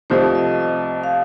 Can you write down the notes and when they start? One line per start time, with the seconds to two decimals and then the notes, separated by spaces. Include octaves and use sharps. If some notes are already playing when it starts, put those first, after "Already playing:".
0.10 C2 C3 F3 A3 D#4 C5
0.35 D#5
0.60 D#5
1.04 F5